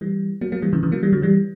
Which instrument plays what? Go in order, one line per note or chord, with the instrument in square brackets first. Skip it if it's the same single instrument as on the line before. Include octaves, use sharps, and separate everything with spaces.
[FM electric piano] E3 G3
F#3 A#3
F#3 A#3
E3 G3
C#3 E3
C#3 E3
F#3 A#3
E3 G3
D3 F#3
E3 G3